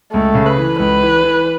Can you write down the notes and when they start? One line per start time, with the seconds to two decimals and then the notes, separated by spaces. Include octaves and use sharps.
0.13 C#2 A3
0.35 C#3
0.46 B4
0.57 E3
0.79 C#2 B4
1.02 E3
1.23 E3